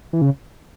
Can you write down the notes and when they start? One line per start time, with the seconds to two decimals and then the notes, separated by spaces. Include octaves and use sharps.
0.13 E3
0.22 C#3